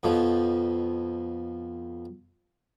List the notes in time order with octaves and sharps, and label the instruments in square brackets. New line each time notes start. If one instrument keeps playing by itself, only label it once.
[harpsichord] F2 B2 F3